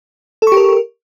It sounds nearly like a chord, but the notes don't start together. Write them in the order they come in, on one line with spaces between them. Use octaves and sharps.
A4 C#6 G4 A#4